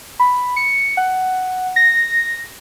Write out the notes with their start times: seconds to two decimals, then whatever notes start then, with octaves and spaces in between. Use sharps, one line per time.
0.20 B5
0.56 C#7
0.97 F#5
1.76 A#6